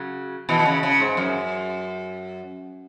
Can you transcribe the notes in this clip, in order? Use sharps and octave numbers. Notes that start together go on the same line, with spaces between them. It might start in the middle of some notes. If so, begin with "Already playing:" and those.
Already playing: C#3 F#3
B2 E3
E3
C#3
C#3
G#2
F#2